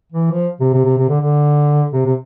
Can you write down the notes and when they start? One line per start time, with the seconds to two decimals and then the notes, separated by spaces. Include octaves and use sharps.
0.12 E3
0.31 F3
0.60 C3
0.73 C3
0.85 C3
0.97 C3
1.09 D3
1.21 D3
1.93 C3
2.05 C3